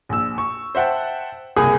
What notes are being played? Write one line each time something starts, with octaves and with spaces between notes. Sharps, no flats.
A#1 E6
C#6
C5 E5 F#5 G5 A5
F#1 C2 A#3 G#4 G#5 D#6